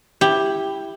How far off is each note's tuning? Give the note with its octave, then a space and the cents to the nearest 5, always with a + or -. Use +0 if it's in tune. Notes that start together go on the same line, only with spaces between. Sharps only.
E4 +0 G4 +5